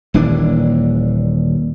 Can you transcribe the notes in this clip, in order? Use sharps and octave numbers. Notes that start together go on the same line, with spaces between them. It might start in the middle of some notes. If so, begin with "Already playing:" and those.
D#1 D#2 E3 D4